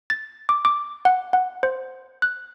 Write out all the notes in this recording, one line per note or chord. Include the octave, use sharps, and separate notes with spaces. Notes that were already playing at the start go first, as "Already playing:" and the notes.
A6
D6
D6
F#5
F#5
C5
F#6